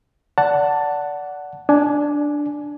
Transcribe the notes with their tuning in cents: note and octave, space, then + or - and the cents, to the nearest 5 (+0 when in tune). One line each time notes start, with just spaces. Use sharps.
D5 -20 F#5 +0 A5 +10
D4 +0 G#5 +20